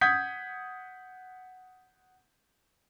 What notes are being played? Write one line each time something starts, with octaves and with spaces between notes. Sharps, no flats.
F#5 D#6 G6 G#6 B6